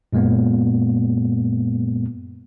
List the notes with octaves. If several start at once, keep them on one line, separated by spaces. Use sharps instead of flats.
F#2 A#2 G#3 A#3 B3